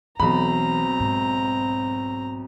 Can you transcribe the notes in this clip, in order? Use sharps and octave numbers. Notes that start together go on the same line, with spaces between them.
B1 E3 C4 A#5 B5
G#2